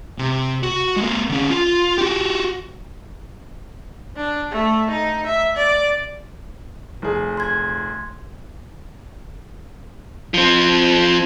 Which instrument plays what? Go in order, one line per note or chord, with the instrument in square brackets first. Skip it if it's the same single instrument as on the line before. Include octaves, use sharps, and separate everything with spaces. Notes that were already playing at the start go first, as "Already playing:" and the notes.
[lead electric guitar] C3
F#4
G#3 A#3
D3 C#4
F4
F#4 G4
[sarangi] D4
A3
D#4
E5
D5
[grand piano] F1 G#4
[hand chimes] C6 G#6
[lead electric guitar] F3 C4